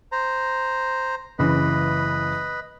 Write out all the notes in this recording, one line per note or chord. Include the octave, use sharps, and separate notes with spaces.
C5 A#5
F#1 C#3 E3 B4 D#5